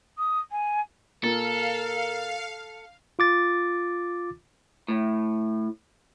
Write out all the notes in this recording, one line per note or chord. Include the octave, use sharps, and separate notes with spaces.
D#6
G#5
A#2 A4 A#4 F5
F4 D6 A6
A2